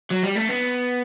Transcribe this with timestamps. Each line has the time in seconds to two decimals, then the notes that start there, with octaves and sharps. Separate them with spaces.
0.11 F#3
0.24 G3
0.37 A3
0.50 B3